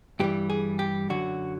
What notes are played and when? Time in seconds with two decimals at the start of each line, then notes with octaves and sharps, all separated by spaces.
0.20 G2 E3 G3 G4
0.50 G#4
0.79 G4
1.09 F#2 D3 F#3 F#4